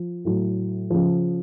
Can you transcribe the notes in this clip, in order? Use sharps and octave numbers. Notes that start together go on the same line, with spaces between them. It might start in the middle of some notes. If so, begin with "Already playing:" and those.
Already playing: F3
A2 F#3
C#3 F3